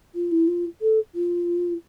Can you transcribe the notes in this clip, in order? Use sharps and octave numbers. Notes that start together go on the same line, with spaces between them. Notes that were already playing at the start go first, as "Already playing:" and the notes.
F4
E4
F4
A4
F4